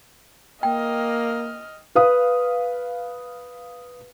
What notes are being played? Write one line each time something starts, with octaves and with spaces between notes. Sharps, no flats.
A#3 D#5 G5 F6
B4 F5 D#6